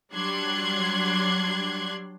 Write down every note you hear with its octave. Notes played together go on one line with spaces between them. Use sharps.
F#3 G3 D4 C6 F#6 G#6